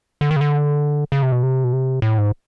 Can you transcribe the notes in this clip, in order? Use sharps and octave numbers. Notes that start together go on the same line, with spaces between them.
D3
D#3
C#3
D3
C#3
C3
B2
C3
B2
C3
A2
G#2